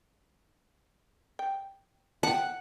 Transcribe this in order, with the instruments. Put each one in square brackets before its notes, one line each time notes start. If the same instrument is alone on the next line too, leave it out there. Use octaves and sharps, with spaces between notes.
[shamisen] G5
[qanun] F#5 [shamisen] G5 A5